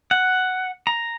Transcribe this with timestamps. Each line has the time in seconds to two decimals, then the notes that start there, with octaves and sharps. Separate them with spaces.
0.11 F#5
0.87 A#5